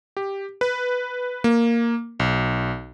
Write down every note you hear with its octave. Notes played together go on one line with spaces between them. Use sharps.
G4
B4
A#3
B1